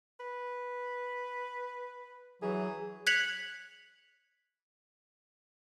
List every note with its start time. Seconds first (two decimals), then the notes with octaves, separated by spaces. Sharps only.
0.20 B4
2.42 E3 F#3 G#4
3.07 F#6 G#6 B6 C#7 F7 F#7